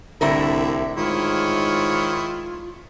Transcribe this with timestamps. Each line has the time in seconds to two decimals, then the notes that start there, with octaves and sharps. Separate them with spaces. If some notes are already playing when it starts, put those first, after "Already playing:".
0.21 C2 A2 D3 E4 A#4 E5
0.97 G#2 D#3 E4 F4 C#5